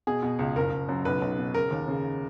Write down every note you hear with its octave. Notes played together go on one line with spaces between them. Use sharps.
B2 G#4
B2
C#2
F#1 A#4
F#1
F#2
B1 B4
B1
B2
C#3 A#4
D#2
C#3